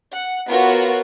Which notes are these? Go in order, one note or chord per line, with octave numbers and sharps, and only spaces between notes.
F#5
B3 F4 F#4 A#4 C#5